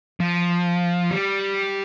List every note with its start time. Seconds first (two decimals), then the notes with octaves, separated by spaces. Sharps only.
0.21 F3
1.11 G3